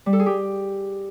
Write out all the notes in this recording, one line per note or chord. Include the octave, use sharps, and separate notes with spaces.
G3
A4
G#4
G4